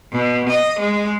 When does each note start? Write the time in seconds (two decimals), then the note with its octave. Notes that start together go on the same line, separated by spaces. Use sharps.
0.12 B2
0.49 D#5
0.79 G#3